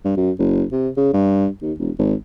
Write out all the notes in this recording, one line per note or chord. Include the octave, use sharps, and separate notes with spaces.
G2
F#2
F#1
C3
C#3
G2
D#2
E1
G#1